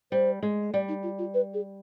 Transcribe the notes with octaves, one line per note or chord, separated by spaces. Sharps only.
G3 C5
G#3
G3 D5
D#4
F4
F4
B4
G#4